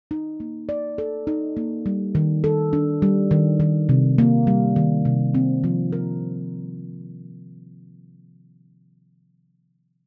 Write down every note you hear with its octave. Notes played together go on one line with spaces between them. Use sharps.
D#4
A#3
D5
A4
D#4
A#3
G3
D#3
A4
D4
G3
D#3
D#3
C3
A#3
G3
D#3
C3
C4
F3
A#4